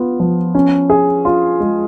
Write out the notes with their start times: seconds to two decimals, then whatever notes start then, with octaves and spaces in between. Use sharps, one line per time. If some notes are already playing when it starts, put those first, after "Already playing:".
Already playing: B3 F4
0.20 F3
0.55 C#4
0.90 G#4
1.25 F4
1.60 G#3